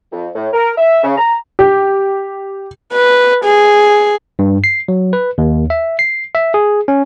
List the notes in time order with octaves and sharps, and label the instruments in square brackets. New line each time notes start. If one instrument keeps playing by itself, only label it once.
[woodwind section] F2
A2
A#4
E5
C#3
A#5
[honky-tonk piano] G4
[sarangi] B4
G#4
[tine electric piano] G2
C7
F#3
B4
D#2
E5
C7
E5
G#4
C#4